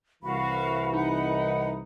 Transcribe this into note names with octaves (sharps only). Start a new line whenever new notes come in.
C2 E3 F#4 F5 B5
D#4 F#5